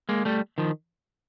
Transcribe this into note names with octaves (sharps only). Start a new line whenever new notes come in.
G#3 A#3
G3 A3
D#3 F3